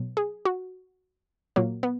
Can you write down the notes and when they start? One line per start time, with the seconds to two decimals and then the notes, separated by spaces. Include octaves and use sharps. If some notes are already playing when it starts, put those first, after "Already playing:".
Already playing: B2 F#3
0.17 G#4
0.45 F#4
1.56 A#2 F#3 A#3
1.83 B3